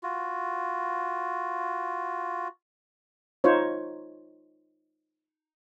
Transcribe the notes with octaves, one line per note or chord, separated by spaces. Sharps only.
F4 F#4
D#4 F4 C5 C#5